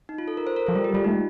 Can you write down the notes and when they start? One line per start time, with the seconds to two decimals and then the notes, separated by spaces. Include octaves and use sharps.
0.09 D#4
0.18 F4
0.28 A4
0.37 A#4
0.47 C5
0.56 A#4
0.66 F3 A4
0.75 G3 F4
0.84 G4
0.94 G3 F4
1.04 A3 D#4
1.14 G3